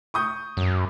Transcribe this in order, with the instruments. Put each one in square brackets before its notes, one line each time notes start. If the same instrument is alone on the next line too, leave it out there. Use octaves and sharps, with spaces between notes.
[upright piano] C#6 D#6 G6
[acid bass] F#2